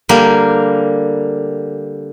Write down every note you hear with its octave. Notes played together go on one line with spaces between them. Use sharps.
D3 G3 A#3 A#4